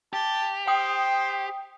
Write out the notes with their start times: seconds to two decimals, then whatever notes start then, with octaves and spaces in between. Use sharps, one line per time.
0.13 G4 A5
0.67 C5 G5 D#6